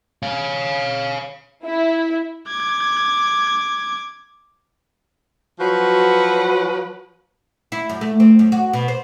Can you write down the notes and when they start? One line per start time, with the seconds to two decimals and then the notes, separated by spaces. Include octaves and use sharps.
0.23 C#5 F5
1.64 E4
2.48 D6 G#6
5.59 F3 F#3 F#4 B4
7.72 E4
7.90 F#2
8.01 A3
8.20 C4
8.39 F#2
8.52 F#4
8.73 B2
8.88 C5